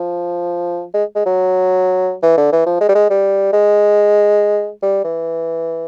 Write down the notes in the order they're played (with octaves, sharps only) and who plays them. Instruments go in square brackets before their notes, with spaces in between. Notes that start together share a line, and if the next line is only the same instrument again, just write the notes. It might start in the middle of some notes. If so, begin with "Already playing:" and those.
Already playing: [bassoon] F3
G#3
G#3
F#3
E3
D3
E3
F3
G#3
G3
G#3
G3
G#3
G3
E3